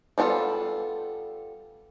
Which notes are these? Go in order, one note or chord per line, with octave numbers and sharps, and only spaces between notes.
G3 B3 D4 F4 A4